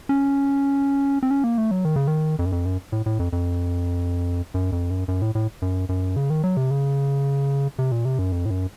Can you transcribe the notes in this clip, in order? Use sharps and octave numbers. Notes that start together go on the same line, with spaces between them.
C#4
C4
C#4
A#3
A3
F#3
D#3
C#3
D#3
F2
F#2
F2
F#2
A2
A2
F2
F2
F#2
F2
F#2
F#2
A2
A2
F#2
F#2
C#3
D#3
F#3
C3
C#3
C3
A#2
C3
F#2
F2
A2
F#2